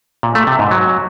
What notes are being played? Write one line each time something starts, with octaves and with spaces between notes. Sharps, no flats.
A#2
A3
C3
G#2
F#3